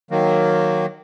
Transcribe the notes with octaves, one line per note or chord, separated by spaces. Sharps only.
D#3 F#3 A#3